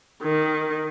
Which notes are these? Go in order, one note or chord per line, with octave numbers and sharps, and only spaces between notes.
D#3